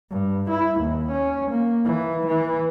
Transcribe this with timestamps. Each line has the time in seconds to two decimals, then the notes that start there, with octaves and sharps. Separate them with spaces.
0.11 G2
0.50 E4
0.81 D#2
1.12 C#4
1.51 A#3
1.85 E3
2.27 E3